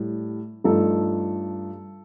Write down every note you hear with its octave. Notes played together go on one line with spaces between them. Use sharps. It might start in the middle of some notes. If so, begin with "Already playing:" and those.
Already playing: A2 G3
G2 F3 A3 D#4 A4